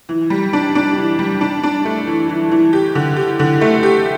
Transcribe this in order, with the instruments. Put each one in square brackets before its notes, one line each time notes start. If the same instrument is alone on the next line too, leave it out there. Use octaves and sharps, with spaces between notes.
[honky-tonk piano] E3
G3
D4
D4
E3
G3
D4
D4
A3
E3
E3
E3
G4
D3
G4
D3
A3
G4